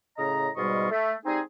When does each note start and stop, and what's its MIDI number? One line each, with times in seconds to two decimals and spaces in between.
0.18 0.49 45
0.18 0.49 49
0.18 0.49 75
0.18 0.49 82
0.56 0.87 44
0.56 0.87 47
0.56 0.87 55
0.56 0.87 65
0.56 0.87 75
0.56 0.87 85
0.91 1.14 57
1.26 1.40 55
1.26 1.40 60
1.26 1.40 63
1.26 1.40 68